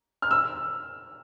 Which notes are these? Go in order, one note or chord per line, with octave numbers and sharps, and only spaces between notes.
F6
E6